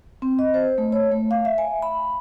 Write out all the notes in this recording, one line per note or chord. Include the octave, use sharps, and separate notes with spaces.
C4
D#5
C5
A3
C#5
A3
F5
E5
G#5
B5